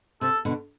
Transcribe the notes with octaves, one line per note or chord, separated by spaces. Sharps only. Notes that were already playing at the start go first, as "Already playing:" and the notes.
C3 A4
B2 D3